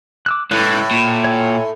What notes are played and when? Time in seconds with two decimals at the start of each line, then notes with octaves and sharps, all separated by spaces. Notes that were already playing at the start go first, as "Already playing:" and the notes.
0.26 D6 E6 F#6
0.51 C#2 A2 E3 F#6
0.91 A#2
1.24 C#5 G#5 E6